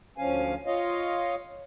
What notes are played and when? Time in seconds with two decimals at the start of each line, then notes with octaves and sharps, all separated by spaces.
0.18 D2 F3 C#4 F5 G#5
0.66 F4 C#5 D#5 F5